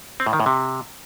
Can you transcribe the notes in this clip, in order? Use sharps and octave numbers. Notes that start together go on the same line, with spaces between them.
C4
A2
D#3
A2
C3